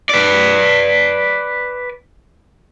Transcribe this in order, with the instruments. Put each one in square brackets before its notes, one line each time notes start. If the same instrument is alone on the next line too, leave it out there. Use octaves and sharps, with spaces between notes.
[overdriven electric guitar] B4 D5